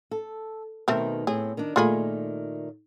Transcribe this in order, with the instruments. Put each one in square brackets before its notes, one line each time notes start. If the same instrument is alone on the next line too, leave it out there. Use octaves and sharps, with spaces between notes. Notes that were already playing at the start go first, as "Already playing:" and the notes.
[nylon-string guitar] A4
[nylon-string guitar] B2 D#3 [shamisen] A3 C4 A#4
[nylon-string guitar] A2 C4 [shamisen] G#4
[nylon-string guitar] D#3 D4
[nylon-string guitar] A#2 D#3 A3 [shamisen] F4 G#4 B5